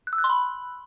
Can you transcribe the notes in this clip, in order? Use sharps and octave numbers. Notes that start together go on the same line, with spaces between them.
F#6
E6
F#6
C6
B5